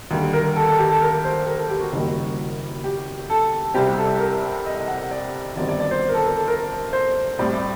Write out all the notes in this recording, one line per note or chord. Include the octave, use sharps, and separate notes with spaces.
D#2 D3 G3
A#4
A4
A4
G4
A4
A#4
C5
A#4
A4
G4
F#4
F#1 F#2 D#3 G3 A#3
G4
A4
C2 C3 G3 C4 G4
A4
A#4
D#5
D#5
F#5
D5
G1 F#2 D#3 G3 C4 D5
D5
D5
C5
A#4
A4
A#4
A4
A#4
C5
A2 G3 C4 D5
D5